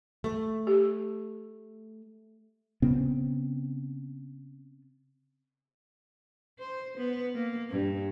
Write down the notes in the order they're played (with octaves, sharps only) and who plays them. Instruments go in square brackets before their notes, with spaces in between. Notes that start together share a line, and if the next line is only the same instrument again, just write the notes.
[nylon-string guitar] A3
[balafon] G4
[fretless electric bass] C#3 B3 C4
[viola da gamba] C5
B3
A#3
G2